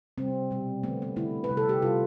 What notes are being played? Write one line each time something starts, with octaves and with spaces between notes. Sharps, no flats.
C3 G3 C4
B2 G3
D3 A3 B3
B3
D3 A3 E4
B4
C3 G3
A4
G4
C3 G3 F4